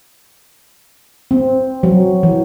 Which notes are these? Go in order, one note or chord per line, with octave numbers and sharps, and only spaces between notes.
C4
F#3
E3